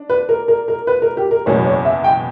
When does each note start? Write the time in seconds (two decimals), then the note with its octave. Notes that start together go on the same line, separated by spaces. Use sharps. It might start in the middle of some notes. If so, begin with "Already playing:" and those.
Already playing: D4
0.10 B4
0.29 A#4
0.48 A#4
0.68 A#4
0.87 B4
1.02 A#4
1.17 G4
1.31 A#4
1.46 F#1 E2 B2 F#3 C#5
1.65 C#5
1.85 E5
2.04 G5